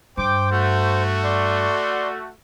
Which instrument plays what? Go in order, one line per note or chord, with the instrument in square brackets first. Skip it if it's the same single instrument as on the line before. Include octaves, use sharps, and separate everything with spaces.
[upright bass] G2 [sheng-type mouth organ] C5 [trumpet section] G5 D6
[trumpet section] A3 F#4
[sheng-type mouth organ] D5 C6